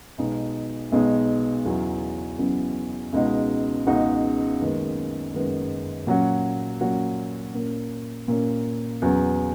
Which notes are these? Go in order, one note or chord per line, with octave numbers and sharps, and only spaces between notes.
B1 B2 G#3 D#4
B1 B2 G#3 D#4
E2 C#3 F#3 C#4 E4
E2 C#3 F#3 C#4 E4
C#2 B2 G#3 D#4 F#4
C#2 B2 G#3 D#4 F#4
F#1 F#2 D#3 G#3 B3
F#1 F#2 D#3 G#3 B3
A#2 F#3 C#4 F#4
A#2 F#3 C#4 F#4
A#2 A#3 C#4
A#2 A#3 C#4
E2 C#3 F#3 B3